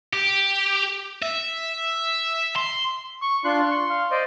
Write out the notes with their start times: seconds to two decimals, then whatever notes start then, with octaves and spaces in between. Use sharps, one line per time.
0.13 G4
1.22 E5
2.56 C6
3.21 C#6
3.45 D4 F4 C6 F#6
3.71 C#6
3.90 F5
4.11 C5 D5 D#5